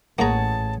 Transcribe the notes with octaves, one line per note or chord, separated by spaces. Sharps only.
A1 A#3 G#4 C#5 F#5 A5 A#5